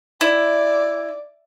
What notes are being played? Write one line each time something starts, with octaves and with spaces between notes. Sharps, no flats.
E4 D5